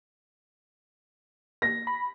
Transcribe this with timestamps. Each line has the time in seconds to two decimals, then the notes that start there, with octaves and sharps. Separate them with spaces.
1.62 A#6
1.87 B5